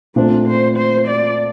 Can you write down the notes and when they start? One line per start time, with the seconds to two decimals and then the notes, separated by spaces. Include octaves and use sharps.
0.15 A#2 A3 C4 D4
0.47 C5
0.77 C5
1.07 D5